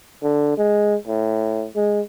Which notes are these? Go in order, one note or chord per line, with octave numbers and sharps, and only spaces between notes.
D3
G#3
A2
G#3